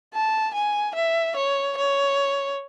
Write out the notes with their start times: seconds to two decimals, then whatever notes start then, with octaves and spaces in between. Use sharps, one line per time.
0.14 A5
0.54 G#5
0.95 E5
1.36 C#5
1.77 C#5